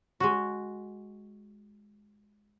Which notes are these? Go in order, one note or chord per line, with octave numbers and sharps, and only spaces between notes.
G#3 F#4